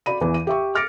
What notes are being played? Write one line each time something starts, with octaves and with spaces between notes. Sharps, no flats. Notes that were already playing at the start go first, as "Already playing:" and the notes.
F#4 D5 B5 D#7
E2 E3
D#7
G4 E5 C#6
D6 F6 A6 A#6 C#7 D7